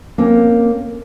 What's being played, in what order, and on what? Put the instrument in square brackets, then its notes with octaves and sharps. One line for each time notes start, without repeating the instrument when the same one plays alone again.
[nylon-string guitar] A#3 C4 C#4